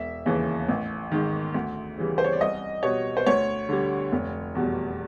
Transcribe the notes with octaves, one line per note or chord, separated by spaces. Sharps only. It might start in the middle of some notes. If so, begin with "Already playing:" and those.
Already playing: E1 E5
D#2 C#3 E3
A1
G#2 D#3
D2
C#3 E3 G3
C5
C#5
D5
C2 D#5
B2 G3 C#5
C5
D2 C#5
D3 G3
F1
E2 B2 G3